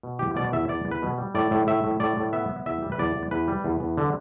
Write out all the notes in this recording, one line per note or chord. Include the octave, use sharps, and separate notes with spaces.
B2
E2 G4
B2 D5
D5
E2 E5
E2 D5
E2
B4
B2
G3
A2 D5
A2
A2 E5
A2
A2 D5
A2
B3 E5
B3
E2 E5
G3
B4
E2 D5
E2
E2 B4
G3
E2
E2
D3